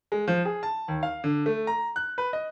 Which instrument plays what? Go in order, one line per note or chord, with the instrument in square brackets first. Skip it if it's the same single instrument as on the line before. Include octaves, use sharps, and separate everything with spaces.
[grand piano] G#3
F3
G#4
A5
D#2
F5
D3
A3
A#5
F#6
B4
D#5